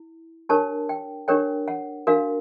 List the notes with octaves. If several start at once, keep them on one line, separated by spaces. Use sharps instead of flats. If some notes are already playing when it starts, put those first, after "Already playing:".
Already playing: E4
D4 G4 A#4 C#5 A5
G5
D4 G4 A#4 C#5 G5
F#5
D4 F#4 A#4 F5